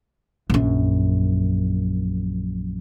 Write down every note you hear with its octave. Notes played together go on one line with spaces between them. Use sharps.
A#1 F#2